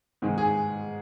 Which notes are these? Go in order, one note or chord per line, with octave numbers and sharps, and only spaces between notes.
G#2 D#3 G#3
G#4